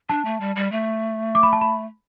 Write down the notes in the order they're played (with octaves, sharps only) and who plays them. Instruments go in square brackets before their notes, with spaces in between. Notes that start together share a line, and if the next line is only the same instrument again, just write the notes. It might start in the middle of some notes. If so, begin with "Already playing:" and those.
[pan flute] D4 [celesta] A5
[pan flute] A3
G3
G3
A3
[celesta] D6
B5
A5
B5